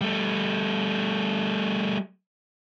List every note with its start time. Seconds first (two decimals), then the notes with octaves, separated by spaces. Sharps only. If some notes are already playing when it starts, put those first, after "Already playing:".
0.01 G3 A3